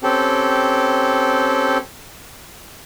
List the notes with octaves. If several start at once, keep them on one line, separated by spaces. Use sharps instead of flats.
C4 C#4 G4 A4